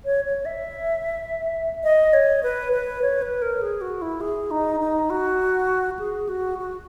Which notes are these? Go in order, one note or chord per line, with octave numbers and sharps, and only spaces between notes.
C#5
C#5
E5
D#5
C#5
B4
B4
C#5
B4
A#4
G#4
F#4
E4
G#4
D#4
D#4
F#4
G#4
F#4
F#4